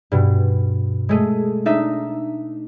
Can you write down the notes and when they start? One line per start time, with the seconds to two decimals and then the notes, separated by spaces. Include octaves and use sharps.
0.12 G2 B2
1.09 G#3 A3 D#7
1.66 D4 D#4 E5 B6